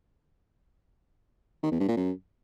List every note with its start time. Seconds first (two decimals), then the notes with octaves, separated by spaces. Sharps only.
1.63 D#3
1.71 E2
1.80 G2
1.88 A#2
1.96 F#2